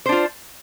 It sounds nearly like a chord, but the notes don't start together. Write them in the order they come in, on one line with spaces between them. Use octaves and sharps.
C5 D4 F4